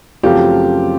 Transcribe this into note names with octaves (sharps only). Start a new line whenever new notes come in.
F#2 C#3 F3 A3 C4 F4 G4